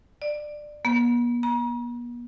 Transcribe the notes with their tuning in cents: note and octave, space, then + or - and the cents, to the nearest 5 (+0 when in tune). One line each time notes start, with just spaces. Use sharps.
D5 +15
B3 -45
A#5 +45